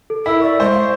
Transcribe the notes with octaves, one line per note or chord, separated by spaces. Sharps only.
A4
E4 A#4 E6 B6
D5 C#6
G#3 C5 C#6
F5